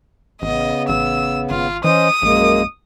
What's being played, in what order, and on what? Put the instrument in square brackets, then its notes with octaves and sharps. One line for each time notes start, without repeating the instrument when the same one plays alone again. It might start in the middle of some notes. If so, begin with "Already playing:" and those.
[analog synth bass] A1 [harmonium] C#3 B3 [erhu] D#5
[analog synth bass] A1 [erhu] E6
[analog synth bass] G#1 [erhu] F4
[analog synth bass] E3 [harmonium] C#4 C5 D#5 [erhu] D#6
[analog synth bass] A#1 [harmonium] F#2 G#3 A#3